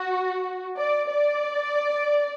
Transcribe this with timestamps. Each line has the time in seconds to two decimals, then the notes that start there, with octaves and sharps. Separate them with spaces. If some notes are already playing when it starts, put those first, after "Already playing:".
Already playing: F#4
0.77 D5
1.09 D5